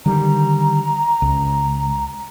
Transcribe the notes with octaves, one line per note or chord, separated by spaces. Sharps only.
D3 D#3 G3 A#5
C#2